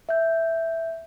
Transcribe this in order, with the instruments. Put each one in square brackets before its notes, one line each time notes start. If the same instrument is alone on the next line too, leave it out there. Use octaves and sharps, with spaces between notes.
[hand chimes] E5 G6